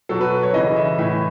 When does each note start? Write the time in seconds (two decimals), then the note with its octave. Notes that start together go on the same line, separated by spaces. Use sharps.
0.09 B2 F#3 A4
0.21 B4
0.43 C#5
0.53 C#3 E3 D#5
0.76 E5
0.98 A2 E3 E5